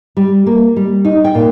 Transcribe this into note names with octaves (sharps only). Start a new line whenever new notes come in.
G3
A#3
G3
D#4
G5
A#2